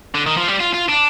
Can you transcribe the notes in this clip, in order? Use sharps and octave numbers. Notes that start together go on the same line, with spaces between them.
D3
D#3
F3
G3
F4
F4
D4